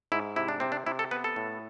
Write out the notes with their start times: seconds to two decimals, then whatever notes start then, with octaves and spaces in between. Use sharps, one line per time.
0.12 G#2 E4
0.36 C3 E4
0.48 D4
0.60 C3 C4
0.72 D4
0.86 C3 E4
0.99 A4
1.11 B3 B4
1.24 A4
1.36 A2